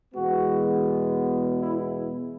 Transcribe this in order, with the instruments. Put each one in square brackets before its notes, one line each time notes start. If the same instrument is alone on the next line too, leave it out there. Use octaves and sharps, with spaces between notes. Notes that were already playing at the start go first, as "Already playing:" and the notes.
[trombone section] E2 B2 G#3 B3 F#4
E4